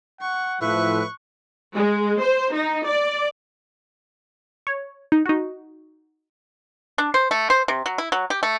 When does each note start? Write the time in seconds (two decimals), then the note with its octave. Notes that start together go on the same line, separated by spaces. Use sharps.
0.21 F#5 C#6
0.61 A2 F3 B4 E5 C#6 F#6
1.75 G#3
2.22 C5
2.53 D#4
2.87 D5
4.67 C#5
5.12 D#4
5.26 D#4 F#4
6.98 D4
7.14 C5
7.31 A3
7.50 C5
7.68 C3
7.86 F#3
7.98 E4
8.12 F#3
8.30 G4
8.43 A3